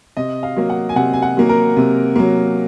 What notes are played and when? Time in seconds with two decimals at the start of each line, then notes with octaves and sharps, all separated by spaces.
0.17 C3 D#5
0.43 F5
0.56 F#3 A#3
0.70 F#5
0.89 G#5
0.96 C3 F#5
1.13 G#5
1.22 F#5
1.37 F#3 A#3
1.49 A#4
1.77 C3
2.16 F#3 A#3